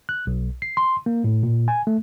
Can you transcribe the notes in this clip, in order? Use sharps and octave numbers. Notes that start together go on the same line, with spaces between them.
F#6
B1
C7
C6
A#3
A2
A#2
G#5
A3